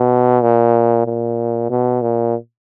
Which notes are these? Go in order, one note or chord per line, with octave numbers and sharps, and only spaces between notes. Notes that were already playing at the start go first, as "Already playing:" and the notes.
Already playing: B2
A#2
A#2
B2
A#2